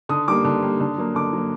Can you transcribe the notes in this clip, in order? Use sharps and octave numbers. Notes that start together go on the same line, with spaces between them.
D3 D#6
G3 A#3 D6
D3
G3 A#3
D3
F#3 A#3
D3 D6
F#3
A#3